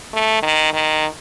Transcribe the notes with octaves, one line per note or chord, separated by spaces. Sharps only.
A3
D#3
D#3